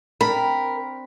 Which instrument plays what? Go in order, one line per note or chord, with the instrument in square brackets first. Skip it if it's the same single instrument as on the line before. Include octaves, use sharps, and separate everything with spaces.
[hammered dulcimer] C4 D4 G5 [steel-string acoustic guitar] A#4 [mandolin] B5